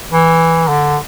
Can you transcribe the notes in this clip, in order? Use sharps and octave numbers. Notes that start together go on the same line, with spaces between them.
E3
D3